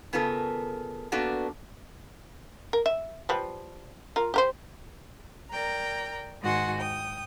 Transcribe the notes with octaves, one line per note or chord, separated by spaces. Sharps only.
C#3 B3 F4 A4 A#4
A#3 B3 D4 F#4 A4
A#4
E5
F3 G3 B4
F4 A#4
G4 A#4 C5
A#4 D5 G5 A#5
G#2 D#3 F#4 F#5 G#5 C6
G5 D#6